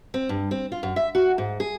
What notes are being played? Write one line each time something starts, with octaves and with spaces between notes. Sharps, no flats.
C4
G2
C4
F4
F#2
E5
F#4
G#2
G#4